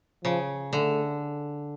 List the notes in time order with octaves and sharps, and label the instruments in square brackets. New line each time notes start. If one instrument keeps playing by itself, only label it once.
[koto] C#3 [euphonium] F3
[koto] D3 [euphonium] A3